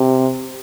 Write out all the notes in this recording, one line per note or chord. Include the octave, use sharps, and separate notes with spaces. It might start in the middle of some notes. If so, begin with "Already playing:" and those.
Already playing: C3